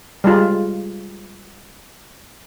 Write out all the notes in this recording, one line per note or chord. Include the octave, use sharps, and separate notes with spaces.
G3 G#3 F4